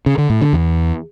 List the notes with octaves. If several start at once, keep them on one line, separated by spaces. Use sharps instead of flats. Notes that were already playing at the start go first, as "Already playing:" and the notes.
C#3
D3
A2
D3
E2